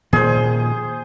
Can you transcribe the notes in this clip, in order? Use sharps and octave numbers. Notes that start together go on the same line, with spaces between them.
A#2 D#3 F3 G#4 C5